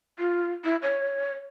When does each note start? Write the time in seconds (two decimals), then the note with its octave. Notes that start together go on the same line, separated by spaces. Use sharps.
0.19 F4
0.65 E4
0.82 C#5